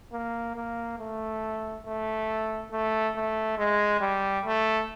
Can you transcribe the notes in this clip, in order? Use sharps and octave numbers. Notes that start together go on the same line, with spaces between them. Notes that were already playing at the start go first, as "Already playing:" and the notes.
A#3
A#3
A3
A3
A3
A3
G#3
G3
A3